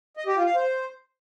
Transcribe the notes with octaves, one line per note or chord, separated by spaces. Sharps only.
D#5
G4
F4
F5
C5